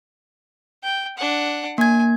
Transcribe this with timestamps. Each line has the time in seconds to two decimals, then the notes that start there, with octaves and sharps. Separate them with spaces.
0.83 G5
1.18 D4 F#5
1.78 A#3 G#5 G#6